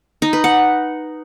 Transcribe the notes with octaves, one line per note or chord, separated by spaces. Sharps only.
D#4
B4
F#5